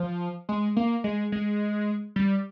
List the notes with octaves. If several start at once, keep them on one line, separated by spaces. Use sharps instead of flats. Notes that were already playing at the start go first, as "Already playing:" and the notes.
Already playing: F3
G#3
A#3
G#3
G#3
G3